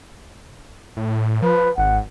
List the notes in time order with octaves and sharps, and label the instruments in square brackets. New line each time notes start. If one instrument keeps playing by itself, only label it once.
[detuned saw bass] A2
[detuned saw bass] F3 [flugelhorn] B4
[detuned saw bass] G#1 [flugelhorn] F#5